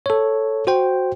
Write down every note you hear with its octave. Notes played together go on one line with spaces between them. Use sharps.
A4 C#5
F#4 C5 G5